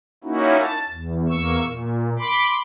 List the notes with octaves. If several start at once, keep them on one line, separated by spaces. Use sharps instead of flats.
A#3 C#4 D#4 E4 F#4
A5
E2
E2 A#3 C#6 E6
A#2
B5 C6 D6